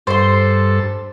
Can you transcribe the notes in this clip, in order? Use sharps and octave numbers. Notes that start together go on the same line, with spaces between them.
G2 A4 C5 C6